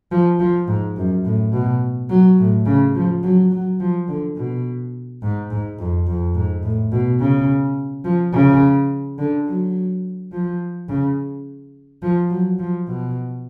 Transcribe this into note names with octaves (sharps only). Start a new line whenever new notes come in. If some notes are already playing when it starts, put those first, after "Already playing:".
F3
F3
G#2
F#2
A2
B2
F#3
A2
C#3
F3
F#3
F#3
F3
D3
B2
G#2
G#2
F2
F2
G#2
A2
B2
C#3
F3
C#3
D3
F#3
F3
C#3
F3
F#3
F3
B2